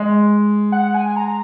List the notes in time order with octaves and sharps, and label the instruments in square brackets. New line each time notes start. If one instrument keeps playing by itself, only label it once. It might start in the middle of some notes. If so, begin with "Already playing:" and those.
Already playing: [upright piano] G#3
[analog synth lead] F#5
G#5
A#5